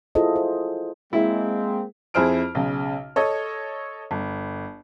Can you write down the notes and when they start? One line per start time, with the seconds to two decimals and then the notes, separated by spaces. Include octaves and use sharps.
0.15 E4 F4 G#4 A4 C5 D#5
0.36 C5
1.13 G#3 A#3 C4 E4
2.14 F2 E4 G#4 C5 F6 D7
2.55 B1 C#3
3.16 A4 C#5 D#5
4.11 G1